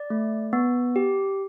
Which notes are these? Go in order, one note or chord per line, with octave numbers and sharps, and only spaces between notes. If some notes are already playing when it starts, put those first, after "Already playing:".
Already playing: D5
A3
B3
G4